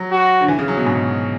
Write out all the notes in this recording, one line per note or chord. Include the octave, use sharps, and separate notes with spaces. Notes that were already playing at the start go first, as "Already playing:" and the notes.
Already playing: F#3
F#4
D3
E3
C#3
F#3
B2
G#2